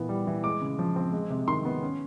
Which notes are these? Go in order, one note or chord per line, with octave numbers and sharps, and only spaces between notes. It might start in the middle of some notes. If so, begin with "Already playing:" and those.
Already playing: A#2 E3 B3
G3
E3
G#3 D6
C#3
F3
C4
G#3
C3
D#3 C6
B3
C#4